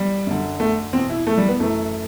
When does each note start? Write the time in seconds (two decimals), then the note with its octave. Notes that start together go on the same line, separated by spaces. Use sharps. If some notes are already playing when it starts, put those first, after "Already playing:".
Already playing: E3 G3
0.27 F#2 D3
0.60 A3
0.93 E2 B2 C4
1.10 E4
1.27 A3
1.38 G3
1.49 B3
1.60 F#2 E3 A3